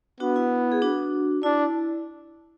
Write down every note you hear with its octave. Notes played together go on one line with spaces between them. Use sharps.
B3 D4 F#4
E4
G#4
D4 F#4
D4 E4